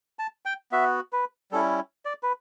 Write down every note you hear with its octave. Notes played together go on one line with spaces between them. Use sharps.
A5
G5
B3 F#4 E5
B4
G3 C#4 E4 A4
D5
B4